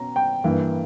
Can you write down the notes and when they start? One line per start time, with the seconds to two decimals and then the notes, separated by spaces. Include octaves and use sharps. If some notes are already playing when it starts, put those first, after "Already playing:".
Already playing: B2 C#4 A#5
0.16 G5
0.44 G2 E3 A#3